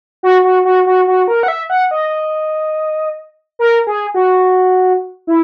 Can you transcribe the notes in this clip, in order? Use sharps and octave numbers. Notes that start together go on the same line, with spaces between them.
F#4
F#4
F#4
F#4
F#4
A#4
F#5
E5
F#5
D#5
A#4
G#4
F#4
E4